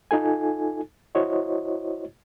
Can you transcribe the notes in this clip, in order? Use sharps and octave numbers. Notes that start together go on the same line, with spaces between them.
D#4 F4 A4 G#5
E4 F#4 C5 C#5 D#5